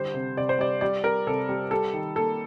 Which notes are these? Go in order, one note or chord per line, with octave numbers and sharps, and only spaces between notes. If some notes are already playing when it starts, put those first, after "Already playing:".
Already playing: D3 G3 C5
C3
C3 D5
C5
G3 D5
G3 D5
G3 A#4
C3 A4
G3
G3 A4
D#3
A#3 A4